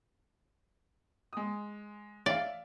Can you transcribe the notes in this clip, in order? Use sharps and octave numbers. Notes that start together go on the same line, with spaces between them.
G#3 D#6
D5 E5 F5